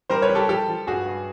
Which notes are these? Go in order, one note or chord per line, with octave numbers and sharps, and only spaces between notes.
G3 A#4 C5
B4 C#5
G3
G4 A4
F3 G4 A4
F3
G2 F#4 G#4
G2